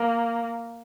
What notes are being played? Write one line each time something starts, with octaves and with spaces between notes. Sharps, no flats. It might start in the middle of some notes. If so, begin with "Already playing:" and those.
Already playing: A#3